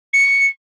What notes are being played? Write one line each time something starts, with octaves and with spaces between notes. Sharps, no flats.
C#7